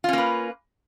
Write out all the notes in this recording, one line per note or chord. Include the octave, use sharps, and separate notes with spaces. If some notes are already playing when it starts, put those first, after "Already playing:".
A#3 C#4 F4 B4